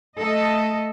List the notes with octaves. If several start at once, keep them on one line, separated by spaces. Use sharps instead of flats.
A3 A4 D#5